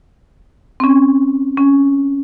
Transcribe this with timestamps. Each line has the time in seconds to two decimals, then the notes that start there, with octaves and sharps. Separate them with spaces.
0.80 C4 C#4
1.57 C#4